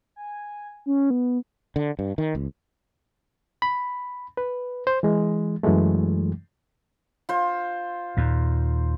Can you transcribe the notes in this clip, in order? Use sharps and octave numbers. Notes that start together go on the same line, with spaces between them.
G#5
C#4
B3
D3
G2
D#3
C#2
B5
B4
C5
E3 G#3
F#2 E3 F#3 G#3 A3
F4 C5
D#2 A#2